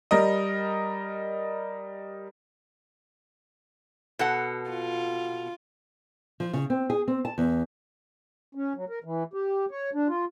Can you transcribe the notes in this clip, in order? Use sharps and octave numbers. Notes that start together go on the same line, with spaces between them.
G3 A#4 D#5
B2 A4 F#5
F4
F3
C#3
C4
G#4
C4
A5
E2
C#4
F#3
A#4
E3
G4
C#5
D4
F4